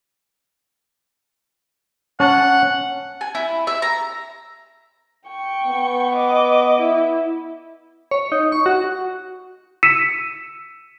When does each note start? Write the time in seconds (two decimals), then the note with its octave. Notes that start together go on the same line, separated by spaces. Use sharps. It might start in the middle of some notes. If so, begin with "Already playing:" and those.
2.20 C#4 F#5 A5
3.21 G#5
3.35 E4
3.67 E5
3.82 A#5
5.29 G5 C#6
5.67 B3
6.15 D#5 D6
6.80 E4
8.11 C#5
8.32 D#4
8.52 C#6
8.66 F#4
9.83 E6 B6 C#7 D#7 E7